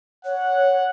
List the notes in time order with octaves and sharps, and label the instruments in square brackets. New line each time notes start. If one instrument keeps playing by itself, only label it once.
[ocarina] C#5 [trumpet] F#5